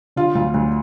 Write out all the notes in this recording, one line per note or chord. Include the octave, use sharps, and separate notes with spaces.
D3 F4
D2 F4
D2